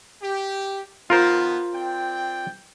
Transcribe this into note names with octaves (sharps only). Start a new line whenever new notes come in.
G4
D#3 F3 B3 F4 A#4 C5
C4 D5 G5